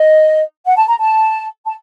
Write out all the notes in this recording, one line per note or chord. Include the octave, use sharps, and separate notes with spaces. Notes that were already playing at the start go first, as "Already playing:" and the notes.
Already playing: D#5
F#5
A5
A#5
A5
A5